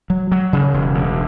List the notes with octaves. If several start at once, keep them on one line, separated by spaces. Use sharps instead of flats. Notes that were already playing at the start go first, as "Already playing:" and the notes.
F#3
F#3
C#3
E1
D2